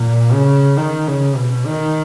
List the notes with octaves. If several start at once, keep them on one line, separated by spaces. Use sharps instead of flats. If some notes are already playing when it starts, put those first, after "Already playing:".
Already playing: A#2
C#3
D#3
C#3
B2
D#3